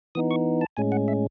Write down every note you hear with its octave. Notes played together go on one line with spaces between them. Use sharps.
E3 B3 D#4 D#6
C#6
A5
A2 G#3 C#4 G#5
F#5
E5